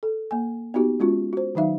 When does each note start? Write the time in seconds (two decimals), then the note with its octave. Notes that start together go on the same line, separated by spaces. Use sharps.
0.03 A4
0.31 A#3 G#5
0.74 B3 D#4 F#4 G4
1.00 G#3 C#4 F4 F#4
1.33 F#4 C5
1.55 D#3 F#3 D#4 E5 F5